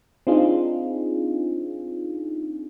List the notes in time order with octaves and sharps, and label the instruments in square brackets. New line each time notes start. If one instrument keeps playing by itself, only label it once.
[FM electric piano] C4 D4 D#4 F4 G#4